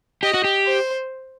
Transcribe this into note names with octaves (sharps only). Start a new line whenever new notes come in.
G4 D#5
F#4
G4
C5